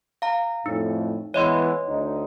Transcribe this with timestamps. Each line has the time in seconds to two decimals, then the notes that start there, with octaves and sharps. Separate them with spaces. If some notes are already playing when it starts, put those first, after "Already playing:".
0.22 F5 A#5
0.66 F2 A2 D#4
1.34 E3 G#3 B3 C#5 D#5 C6
1.87 D2 D#4